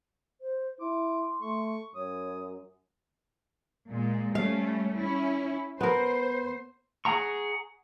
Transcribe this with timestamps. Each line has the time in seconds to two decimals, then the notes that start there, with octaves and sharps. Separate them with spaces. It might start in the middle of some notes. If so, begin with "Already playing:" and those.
0.41 C5
0.81 E4 C6 D6
1.42 A3 C#6
1.95 F#2 C#5 D#6
3.89 A#2 G#3
4.35 G3 A3 C#4 F5
4.98 C#4 E4
5.81 B3 A#4 C5
7.05 G#4 F#5 A#5 C#6